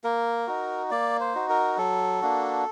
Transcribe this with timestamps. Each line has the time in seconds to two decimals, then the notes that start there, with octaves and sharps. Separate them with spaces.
0.04 A#3 A#4
0.47 D#4 F#4
0.91 A#3 D5
1.20 C5
1.34 D#4 F#4
1.49 A#4
1.77 F#3 A4
2.21 A#3 D4 F#4